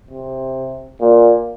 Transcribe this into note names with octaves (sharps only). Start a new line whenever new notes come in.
C3
A#2